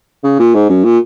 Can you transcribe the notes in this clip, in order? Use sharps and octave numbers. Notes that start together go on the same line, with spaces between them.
C#3
A#2
G#2
F#2
A#2